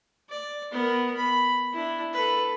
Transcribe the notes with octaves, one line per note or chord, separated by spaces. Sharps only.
D5
B3 A#4
B5
D4 E4
A4 B4